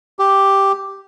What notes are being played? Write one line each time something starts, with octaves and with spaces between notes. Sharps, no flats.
G4